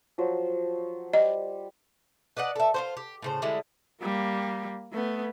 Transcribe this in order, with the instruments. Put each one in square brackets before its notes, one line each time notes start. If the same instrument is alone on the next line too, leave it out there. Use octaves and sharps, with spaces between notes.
[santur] F3 F#3 C5
[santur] G3 [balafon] D#5
[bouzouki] B4 D5 D#5 F#5
A4 E5
F4 F#4 C5
G4
A2 C#3 C5
D3 G3 G#3 E4
[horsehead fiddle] G3 A#3
A3 B3